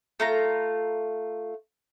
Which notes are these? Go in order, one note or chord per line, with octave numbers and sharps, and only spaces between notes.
A3 F4 A#5